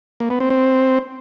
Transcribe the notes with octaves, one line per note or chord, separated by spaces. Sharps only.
A#3
B3
C4
C4